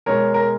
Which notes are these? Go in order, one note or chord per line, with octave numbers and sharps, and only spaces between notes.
B2 G#3 B3 A#4 C#5
A#4